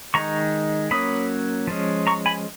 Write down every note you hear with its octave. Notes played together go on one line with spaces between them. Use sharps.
D#3 G#3 D#4 A#5 C#6
F#3 A#3 C#4 B5 D#6
F3 G#3 C#4
A#5 C#6
G#5 B5